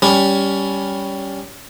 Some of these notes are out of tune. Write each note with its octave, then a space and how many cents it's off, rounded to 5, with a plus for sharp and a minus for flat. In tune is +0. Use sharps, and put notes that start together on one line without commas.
G3 +0 C#4 +15